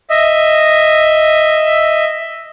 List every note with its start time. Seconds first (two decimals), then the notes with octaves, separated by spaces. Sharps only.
0.10 D#5 E5